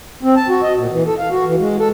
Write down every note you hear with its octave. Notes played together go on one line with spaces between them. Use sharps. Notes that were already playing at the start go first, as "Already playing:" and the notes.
C4
A5
F#4
D#5
A#2
E3
A4
F5
F#4
E3
G#3
A4